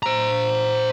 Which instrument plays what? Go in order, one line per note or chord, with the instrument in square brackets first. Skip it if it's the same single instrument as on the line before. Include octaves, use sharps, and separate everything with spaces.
[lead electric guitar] C5 A#5